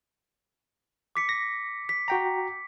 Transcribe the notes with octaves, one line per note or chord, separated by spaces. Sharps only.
D6 B6 C#7
A#6
B6
F#4 G5 A#5